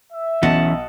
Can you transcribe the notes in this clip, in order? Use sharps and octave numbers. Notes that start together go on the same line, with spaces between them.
E5
B1 E3 C#4 D#5 F#5 A5